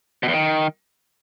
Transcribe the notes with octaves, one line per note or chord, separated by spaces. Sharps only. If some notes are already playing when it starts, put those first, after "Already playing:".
B2
E2
D#3